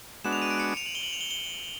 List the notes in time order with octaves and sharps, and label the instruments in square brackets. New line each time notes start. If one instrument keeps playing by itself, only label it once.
[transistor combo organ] G#3 B3 D4 F#4 [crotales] E7
[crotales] F7
D#7
D7
C#7
F7
F#7
G7
F#7
F7
G7
G7